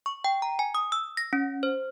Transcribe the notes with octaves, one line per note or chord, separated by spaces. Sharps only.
C#6
G5
A#5
G#5
D#6
E6
A#6
C#4
C5